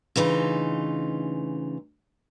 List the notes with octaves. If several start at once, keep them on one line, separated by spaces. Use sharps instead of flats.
D2 C#3 E3 D#4 F4